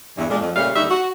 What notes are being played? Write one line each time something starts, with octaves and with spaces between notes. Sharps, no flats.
E2 G2 E3
A#2 G#3 D4
F2
A#2 C#3 G3 A3 C#4 F5
D#2 D3 G3 D#4 F#4 E5
F#4